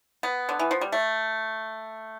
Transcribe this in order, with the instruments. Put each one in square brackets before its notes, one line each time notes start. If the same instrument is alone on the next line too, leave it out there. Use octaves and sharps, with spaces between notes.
[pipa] B3
D3
E3
F3
G3
A3